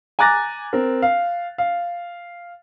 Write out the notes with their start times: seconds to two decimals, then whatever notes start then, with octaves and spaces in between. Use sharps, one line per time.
0.19 G#5 A#5 D6 F#6 A6 A#6
0.73 C4 A#4
1.02 F5
1.58 F5